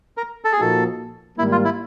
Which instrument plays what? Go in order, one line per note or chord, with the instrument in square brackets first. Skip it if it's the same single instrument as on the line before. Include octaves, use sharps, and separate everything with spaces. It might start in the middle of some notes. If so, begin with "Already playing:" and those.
[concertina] A#4
A4
G#4
[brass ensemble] A#2 F3 A#3 D#4 F#4 [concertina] A4
[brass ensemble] G#2 D#3 G3 A#3 [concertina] E4
[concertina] F4
E4